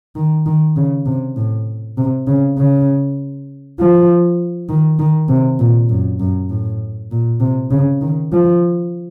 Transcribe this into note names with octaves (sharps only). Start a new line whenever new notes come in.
D#3
D#3
C#3
C3
A2
C3
C#3
C#3
F3
D#3
D#3
C3
A#2
F#2
F#2
A2
A#2
C3
C#3
D#3
F3